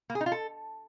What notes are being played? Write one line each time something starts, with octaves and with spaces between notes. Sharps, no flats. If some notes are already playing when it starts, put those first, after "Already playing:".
A#3
G#4
D#4
F4
A4